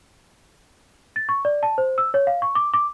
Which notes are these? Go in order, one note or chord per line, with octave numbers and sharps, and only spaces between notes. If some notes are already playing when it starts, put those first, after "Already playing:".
A6
C#6
D5
A5
C5
E6
C#5
F5
C#6
D6
D6